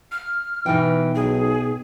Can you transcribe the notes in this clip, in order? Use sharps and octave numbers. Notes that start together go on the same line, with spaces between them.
F6
B2 E3 D#4 G5
B1 G#4